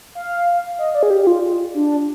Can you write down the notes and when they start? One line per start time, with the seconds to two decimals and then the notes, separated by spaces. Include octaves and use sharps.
0.15 F5
0.79 D#5
0.95 D5
1.03 G#4
1.10 G4
1.21 G4
1.27 F4
1.74 D4